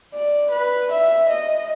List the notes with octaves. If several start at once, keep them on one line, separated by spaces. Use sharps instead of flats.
D5
B4
E5
D#5